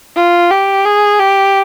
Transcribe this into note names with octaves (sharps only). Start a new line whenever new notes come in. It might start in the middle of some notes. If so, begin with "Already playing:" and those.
F4
G4
G#4
G4